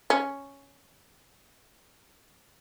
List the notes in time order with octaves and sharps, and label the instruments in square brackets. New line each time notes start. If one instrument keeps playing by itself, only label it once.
[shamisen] C#4